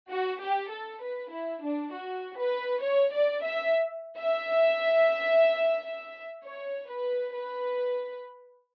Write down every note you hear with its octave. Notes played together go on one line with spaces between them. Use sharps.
F#4
G4
A4
B4
E4
D4
F#4
B4
C#5
D5
E5
E5
C#5
B4
B4